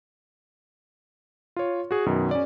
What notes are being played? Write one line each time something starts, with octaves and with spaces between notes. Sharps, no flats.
F4 C#5
F#4 G#4
F#2 B2 D#3
C#4 D5